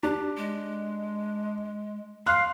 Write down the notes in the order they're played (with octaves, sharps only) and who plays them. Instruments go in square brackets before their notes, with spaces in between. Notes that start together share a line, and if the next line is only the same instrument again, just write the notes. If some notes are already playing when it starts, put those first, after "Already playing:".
[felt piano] D4 [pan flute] G4
[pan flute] G#3
[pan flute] F5 [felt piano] C6 F6 F#6